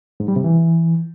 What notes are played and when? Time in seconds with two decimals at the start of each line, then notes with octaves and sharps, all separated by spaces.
0.20 G#2
0.28 G3
0.36 C3
0.44 E3